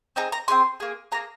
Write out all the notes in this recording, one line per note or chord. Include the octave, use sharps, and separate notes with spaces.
C4 D#4 G#4 A#5
A#5
C4 D#4 G#4 C6
A#3 G#4
A#3 G#4 A#5